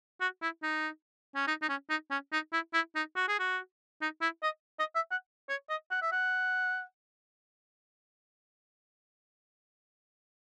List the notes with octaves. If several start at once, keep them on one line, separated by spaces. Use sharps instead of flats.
F#4
E4
D#4
C#4
D#4
D#4
C#4
D#4
C#4
D#4
E4
E4
D#4
F#4
G#4
F#4
D#4
E4
D#5
D#5
E5
F#5
C#5
D#5
F#5
E5
F#5